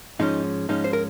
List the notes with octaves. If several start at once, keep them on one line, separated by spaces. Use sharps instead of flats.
G#2 F3 G#3 C#4 D#4
G#2 F3 G#3 C#4 D#4
C5
A#4